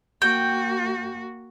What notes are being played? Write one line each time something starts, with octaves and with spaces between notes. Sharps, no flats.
A#3 F#4 G5